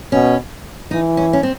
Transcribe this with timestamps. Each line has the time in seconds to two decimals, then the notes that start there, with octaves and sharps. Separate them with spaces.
0.12 B2 C#4
0.91 E3 D#4
1.17 C#4
1.33 C#4
1.43 C4